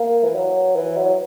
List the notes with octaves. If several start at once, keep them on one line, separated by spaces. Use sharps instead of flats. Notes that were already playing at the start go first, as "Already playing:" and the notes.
Already playing: A#3
E3
F#3
E3
F#3